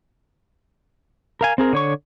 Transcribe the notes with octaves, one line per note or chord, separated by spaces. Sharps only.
A#4 F5 G#5
C4 G#4 A#4
D3 C#5 C#6